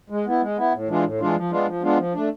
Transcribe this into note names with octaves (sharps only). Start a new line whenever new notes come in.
G#3
B3 E4
G#3
B3 E4
A2
E3 G#3 D4 F4
A2
E3 G#3 D4 F4
F3
G#3 B3 D4 F4
F3
G#3 B3 D4 F4
F3
A3 D4